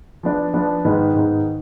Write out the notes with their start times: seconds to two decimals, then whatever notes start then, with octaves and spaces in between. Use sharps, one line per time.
0.23 F3 B3 D4
0.54 F3 B3 D4
0.85 G#2 D#3 G#3 B3 D#4
1.15 G#2 D#3 G#3 B3 D#4